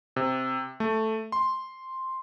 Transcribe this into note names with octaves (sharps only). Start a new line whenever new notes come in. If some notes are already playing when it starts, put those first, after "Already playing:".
C3
A3
C6